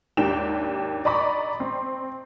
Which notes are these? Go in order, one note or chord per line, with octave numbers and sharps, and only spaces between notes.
G#1 D#2 D4 G4 G5 E7
D5 D#5 A#5 B5 C#6 D6
C4